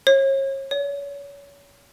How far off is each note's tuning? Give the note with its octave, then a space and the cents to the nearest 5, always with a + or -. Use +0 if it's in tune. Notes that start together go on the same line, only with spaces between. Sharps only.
C#5 -35
C#5 +35